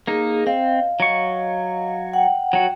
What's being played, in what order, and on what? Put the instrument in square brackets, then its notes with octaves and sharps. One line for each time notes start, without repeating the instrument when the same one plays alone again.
[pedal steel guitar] A#3 D#4 [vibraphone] G#4
[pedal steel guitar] C4 [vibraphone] D#5 F5
[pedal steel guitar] F#3 C#6
[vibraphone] F#5 G5
[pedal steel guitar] F#3 F#4